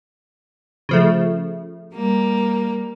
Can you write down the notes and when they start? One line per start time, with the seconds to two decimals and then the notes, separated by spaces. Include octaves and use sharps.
0.89 C#3 F3 A3
1.93 G3 A#3